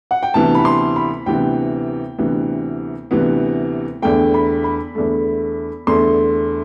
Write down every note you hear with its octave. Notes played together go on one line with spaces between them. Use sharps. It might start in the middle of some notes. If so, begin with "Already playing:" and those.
F#5
G5
D2 C3 E3 B3 A5
B5
C6
B5
D2 C3 E3 B3 G5
D2 C3 E3 B3
D2 C3 E3 B3
E2 D3 A3 G5
B5
B5
E2 D3 A3
E2 D3 A3 C6